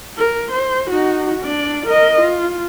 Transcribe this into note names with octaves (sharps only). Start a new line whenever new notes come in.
A#4
C5
D#4 F#4
D4 D5
A#4 D#5
F4